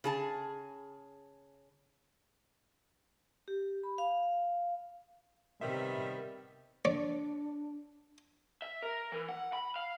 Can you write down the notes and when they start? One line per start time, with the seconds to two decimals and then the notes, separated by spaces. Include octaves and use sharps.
0.04 C#3 G#4 A5
3.48 G4
3.83 B5
3.98 F5
5.61 C3 D#3 G3 B3 E5
6.85 D4 C#5 D5
8.62 E5
8.83 A#4
9.12 E3
9.28 F#5
9.53 B5
9.76 F5